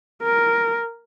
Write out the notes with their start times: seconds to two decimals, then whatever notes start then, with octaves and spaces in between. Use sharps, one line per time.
0.22 A#4